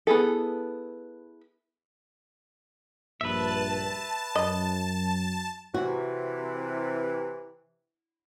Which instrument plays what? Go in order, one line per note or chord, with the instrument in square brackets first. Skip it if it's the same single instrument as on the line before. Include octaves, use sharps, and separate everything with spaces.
[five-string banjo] B3 E4 G#4 A4
[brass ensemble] A#1 G2 [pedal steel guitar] B4 E5 [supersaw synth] A5
[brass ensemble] F#2 [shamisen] D#5
[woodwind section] C3 E3 [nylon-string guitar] F#4